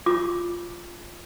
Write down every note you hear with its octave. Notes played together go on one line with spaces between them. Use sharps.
F4 D6